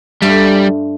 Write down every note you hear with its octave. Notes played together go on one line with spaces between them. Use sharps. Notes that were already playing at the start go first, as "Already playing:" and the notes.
G2 G3 A3 F5